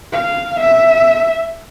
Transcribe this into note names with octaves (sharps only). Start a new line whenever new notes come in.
F5
E5